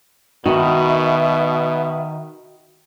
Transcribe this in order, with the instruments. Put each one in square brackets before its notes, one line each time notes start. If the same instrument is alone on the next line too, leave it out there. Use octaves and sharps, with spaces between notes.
[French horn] B2 [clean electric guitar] D#3 [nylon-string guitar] F#4 [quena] E5